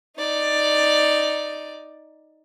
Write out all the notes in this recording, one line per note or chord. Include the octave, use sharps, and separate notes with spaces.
D#4 D5